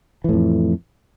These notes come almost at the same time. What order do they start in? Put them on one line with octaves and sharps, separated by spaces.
E3 A2 F2